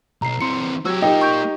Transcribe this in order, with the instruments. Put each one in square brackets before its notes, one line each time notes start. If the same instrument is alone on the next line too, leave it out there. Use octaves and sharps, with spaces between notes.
[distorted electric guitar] B1 B2 [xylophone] A#5 C7
[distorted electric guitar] E3 C4 [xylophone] C6 C#7
[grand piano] F#3 [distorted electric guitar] F#4 G4 [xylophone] E6 G#6
[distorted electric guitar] A#3 F4 [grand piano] D#4 G4 [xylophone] G5
[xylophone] C#6 G6 D7